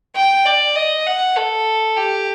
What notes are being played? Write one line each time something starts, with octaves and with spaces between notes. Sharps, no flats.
G5
D5
D#5
F#5
A4
G4